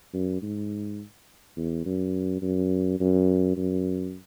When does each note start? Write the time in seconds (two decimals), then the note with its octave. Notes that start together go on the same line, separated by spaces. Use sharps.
0.14 F#2
0.42 G#2
1.57 E2
1.86 F#2
2.42 F#2
3.00 F#2
3.57 F#2